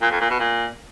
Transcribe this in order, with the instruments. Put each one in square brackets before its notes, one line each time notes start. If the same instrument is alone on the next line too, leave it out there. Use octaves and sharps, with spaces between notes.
[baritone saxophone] A#2
F2
A#2
B2
A#2